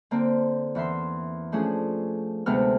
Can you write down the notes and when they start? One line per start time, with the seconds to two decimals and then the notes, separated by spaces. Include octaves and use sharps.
0.11 D3 A#3 C4
0.75 E2 E3 E5 C6
1.52 F3 A3 C#4 D4 G#4
2.46 D2 C3 G#3 A3 B3 F6